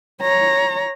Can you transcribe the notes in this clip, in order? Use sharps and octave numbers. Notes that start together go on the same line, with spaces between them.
C#5 A#5